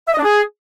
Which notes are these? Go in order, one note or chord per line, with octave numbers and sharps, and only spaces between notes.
E5
D#5
D4
G#4